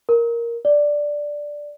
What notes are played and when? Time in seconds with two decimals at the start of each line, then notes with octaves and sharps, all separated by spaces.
0.09 A#4
0.65 D5